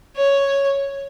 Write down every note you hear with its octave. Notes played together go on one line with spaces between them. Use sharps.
C#5